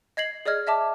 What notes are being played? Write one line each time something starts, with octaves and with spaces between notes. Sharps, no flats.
D#5 G#6 C7 F#7
G#4 D5 D#5 F6 G#6
D#5 E5 A5 D6